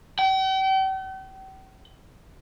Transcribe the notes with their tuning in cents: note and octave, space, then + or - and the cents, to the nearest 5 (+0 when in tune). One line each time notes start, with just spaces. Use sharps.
G5 -40